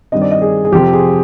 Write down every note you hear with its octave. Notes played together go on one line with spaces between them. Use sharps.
G2 D#3 G3 C4 D#5
D5
D#5
G#4
G#4
F2 C3 F3 C4 G4
G#4